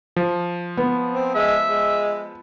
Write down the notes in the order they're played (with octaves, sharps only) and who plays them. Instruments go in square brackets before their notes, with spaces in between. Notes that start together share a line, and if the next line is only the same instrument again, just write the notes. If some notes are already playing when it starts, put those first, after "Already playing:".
[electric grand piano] F3
[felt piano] B3
[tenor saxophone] C4
[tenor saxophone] G#3 [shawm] E5
[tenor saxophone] G#3